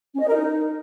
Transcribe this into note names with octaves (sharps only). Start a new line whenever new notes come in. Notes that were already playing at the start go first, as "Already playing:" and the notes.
C#4
D#5
A#4
D#4